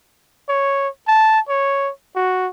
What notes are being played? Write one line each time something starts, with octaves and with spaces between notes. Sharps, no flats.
C#5
A5
C#5
F#4